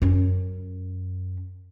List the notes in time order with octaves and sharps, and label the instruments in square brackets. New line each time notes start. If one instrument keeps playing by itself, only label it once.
[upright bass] F#2 C#4